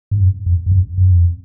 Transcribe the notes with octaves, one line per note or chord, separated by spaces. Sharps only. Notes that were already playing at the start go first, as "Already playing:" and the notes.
G#2
F#2
F2
F2
F#2
F#2
F2